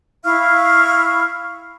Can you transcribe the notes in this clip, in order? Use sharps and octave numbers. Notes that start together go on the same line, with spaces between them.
E4 F5 C#6 F6